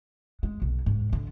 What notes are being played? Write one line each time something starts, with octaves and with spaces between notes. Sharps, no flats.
G#3
B1
G#2
D3